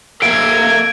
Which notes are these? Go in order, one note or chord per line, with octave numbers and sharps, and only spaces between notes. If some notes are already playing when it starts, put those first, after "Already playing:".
A#3 A4 E5 F5 G#6 D7